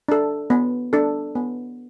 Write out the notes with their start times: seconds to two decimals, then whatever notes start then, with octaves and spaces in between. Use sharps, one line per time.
0.08 D4 A4
0.50 B3
0.93 D4 A4
1.35 B3